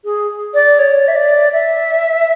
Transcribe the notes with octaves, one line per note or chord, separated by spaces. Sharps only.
G#4
D5
C#5
E5
D5
E5